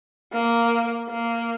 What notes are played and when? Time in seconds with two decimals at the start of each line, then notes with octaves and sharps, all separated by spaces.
0.33 A#3
1.09 A#3